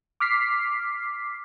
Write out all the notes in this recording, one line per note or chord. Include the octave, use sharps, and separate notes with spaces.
D6 F6 B6 C7